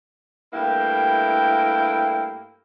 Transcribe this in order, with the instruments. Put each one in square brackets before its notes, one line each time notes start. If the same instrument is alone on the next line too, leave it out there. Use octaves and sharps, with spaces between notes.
[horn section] G2 A3 A#3 E4 G5